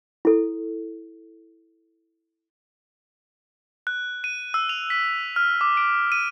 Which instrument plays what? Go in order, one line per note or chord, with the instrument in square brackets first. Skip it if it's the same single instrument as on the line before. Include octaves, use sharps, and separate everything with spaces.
[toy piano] E4 A4
[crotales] F#6
D#7
E6
F7
B6
F6
D6
D7
D#7